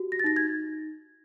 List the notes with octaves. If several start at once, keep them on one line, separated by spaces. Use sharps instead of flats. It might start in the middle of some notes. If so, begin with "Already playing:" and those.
Already playing: F#4 G4
A#6
A6
D#4 A#6
G#6